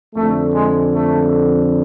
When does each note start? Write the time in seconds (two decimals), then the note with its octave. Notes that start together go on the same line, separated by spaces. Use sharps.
0.15 F2 D3 A3
0.53 G#3
0.92 A3